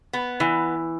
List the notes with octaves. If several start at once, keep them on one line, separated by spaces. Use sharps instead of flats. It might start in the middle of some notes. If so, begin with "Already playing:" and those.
B3
E3